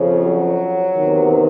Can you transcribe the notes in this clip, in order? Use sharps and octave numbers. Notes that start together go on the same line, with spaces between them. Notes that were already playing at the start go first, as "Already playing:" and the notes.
Already playing: F2 C#3 F3
F#3
E2 C3 D#3